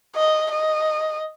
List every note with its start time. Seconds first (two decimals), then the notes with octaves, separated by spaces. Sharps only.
0.16 D#5
0.52 D#5